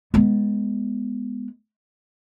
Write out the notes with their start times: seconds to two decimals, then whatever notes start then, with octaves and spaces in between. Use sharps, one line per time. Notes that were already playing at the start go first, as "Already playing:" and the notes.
0.14 G#3 B3